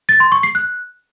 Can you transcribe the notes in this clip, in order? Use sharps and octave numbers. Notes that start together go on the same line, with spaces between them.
A6
C6
C#6
C7
F#6